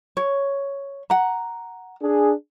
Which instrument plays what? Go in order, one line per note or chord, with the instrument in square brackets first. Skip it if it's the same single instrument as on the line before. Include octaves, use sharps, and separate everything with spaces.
[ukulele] C#5
F#5 A#5
[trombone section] D4 G#4